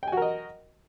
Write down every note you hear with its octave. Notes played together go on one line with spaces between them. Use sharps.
F#4 A#4 D#5 G5 G#5